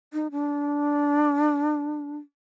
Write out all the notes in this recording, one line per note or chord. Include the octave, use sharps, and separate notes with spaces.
D#4
D4